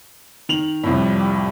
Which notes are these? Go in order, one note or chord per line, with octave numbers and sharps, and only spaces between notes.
D#3 F7 F#7
C2 F2 A2 F3 G3